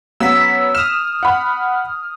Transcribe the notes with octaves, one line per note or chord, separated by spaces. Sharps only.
F#3 B3 C#4 E6 B6
D#6 F6 E7
F#5 B5